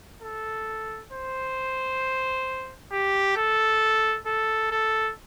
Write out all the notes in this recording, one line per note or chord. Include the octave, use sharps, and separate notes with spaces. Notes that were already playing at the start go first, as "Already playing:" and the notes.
A4
C5
G4
A4
A4
A4